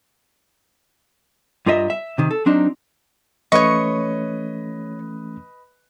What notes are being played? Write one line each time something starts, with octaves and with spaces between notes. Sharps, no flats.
G2 F4 A#4 D#5 E5
E5
C3 D#3
A4
F#3 C4 D4 D#4
E3 A3 C#4 B4 C#5 D#5 C#6